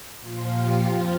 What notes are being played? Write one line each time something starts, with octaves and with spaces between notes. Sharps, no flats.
A#2 F3 F4
G4
F2 F3 F4